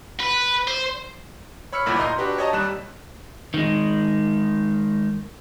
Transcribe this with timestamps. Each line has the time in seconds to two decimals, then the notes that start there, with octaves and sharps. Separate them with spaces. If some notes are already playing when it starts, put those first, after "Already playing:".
0.20 B4
0.67 C5
1.72 C#5 B5 E6 F6 C#7
1.86 G1 D2 A#2 E4 B5 D6
1.99 D#5 A#5 C6 G6
2.18 D4 F#4 G4 B4
2.38 C#5 D#5 A5 A#5
2.52 D#2 G3 F#6 E7
3.54 D#3 G#3